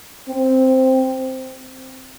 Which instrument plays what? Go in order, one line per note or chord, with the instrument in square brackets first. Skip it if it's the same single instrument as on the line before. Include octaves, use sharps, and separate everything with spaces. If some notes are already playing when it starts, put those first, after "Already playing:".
[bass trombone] C4